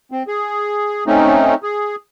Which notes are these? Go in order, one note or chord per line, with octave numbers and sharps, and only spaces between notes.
C4
G#4
A3 C4 C#4 D#4
G#4